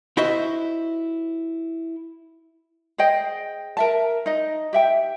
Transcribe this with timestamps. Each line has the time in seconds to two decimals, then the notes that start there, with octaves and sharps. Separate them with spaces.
0.17 E4 F#4 C5 D#5 E5
2.98 G#4 C5 D#5 G5
3.77 A#4 E5 A5
4.26 D#4 D#5
4.73 G4 E5 G5